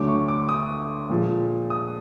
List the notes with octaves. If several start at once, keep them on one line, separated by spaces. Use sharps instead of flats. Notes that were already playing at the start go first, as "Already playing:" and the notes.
Already playing: D2 D3 F#3 A3 D6
C#6
D6
D#6
A#2 F3 G#3
D#6